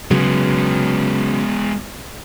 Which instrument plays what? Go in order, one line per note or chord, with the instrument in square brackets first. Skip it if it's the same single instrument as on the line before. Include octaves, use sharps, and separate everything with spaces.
[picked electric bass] C#3 F#3 [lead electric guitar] G#3 B3